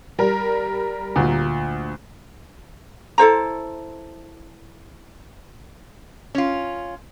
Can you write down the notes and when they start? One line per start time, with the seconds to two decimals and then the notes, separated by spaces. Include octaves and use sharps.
0.19 G3 A#4
1.16 D2 A#2
3.18 E4 A4 C5 A#5
6.35 C#4 F4